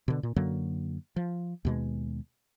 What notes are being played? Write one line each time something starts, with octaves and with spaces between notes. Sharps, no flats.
B2 D3
A#2
F#2 D3 F#3 A#3
F3
D#2 B2 G#3